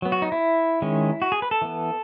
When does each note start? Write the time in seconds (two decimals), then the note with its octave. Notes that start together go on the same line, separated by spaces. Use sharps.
0.02 F#3 B3
0.12 F#4
0.22 D#4
0.32 E4
0.82 D#3 G#3 C#4
1.22 F#4
1.32 G#4
1.42 B4
1.51 A4
1.62 E3 B3